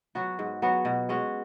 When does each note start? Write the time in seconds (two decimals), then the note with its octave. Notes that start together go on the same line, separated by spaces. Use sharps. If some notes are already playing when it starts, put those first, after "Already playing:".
0.15 F#3 B3 F#4
0.39 G#2
0.62 F#3 B3 F#4
0.85 B2
1.09 G#3 C#4 F#4